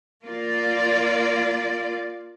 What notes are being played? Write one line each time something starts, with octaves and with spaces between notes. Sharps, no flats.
A#3 F4 D5